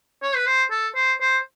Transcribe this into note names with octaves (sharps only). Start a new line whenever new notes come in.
C#5
B4
C5
A4
C5
C5